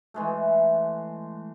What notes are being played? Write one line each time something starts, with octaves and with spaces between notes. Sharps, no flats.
E3 G#3 A3